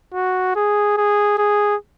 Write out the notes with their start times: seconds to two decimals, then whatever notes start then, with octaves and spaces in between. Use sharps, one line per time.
0.14 F#4
0.56 G#4
0.97 G#4
1.38 G#4